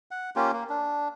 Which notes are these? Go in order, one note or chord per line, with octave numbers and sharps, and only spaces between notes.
F#5
A#3 C#4 F4 G4
A#3
D4